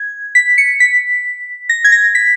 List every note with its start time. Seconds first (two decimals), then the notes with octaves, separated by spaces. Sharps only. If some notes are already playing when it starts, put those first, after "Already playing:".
Already playing: G#6
0.35 B6
0.58 C#7
0.80 B6
1.69 A#6
1.84 G#6
1.92 A#6
2.15 B6